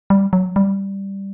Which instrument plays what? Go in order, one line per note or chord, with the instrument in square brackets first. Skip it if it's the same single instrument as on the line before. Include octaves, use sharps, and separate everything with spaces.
[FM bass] G3
F#3
G3